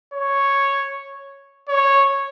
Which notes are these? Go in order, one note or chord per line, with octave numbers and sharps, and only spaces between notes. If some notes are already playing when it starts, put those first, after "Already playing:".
C#5
C#5